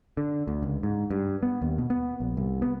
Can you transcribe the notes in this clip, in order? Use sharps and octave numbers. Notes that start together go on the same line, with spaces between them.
D3
D2
C#2
G#2
G2
B3
D#2
B2
B3
A#1
C2
B3